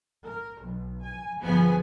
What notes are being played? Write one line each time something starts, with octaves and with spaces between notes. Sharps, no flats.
A#4
B1
G#5
G1 F3 B3 G#4 G#5